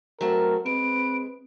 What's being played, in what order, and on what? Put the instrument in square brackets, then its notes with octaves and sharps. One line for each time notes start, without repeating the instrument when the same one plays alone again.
[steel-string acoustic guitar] F#3 A3 C4 [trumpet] A#4
[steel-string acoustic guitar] G#3 [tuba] C4 [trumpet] B4 [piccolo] D7